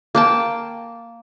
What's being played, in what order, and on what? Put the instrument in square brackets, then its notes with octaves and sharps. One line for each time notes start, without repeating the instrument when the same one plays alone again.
[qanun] A#3 G5 A5